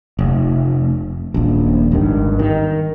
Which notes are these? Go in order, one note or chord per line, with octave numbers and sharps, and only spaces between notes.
F1
D#1 A#1
G#1 G2 D#3
D#3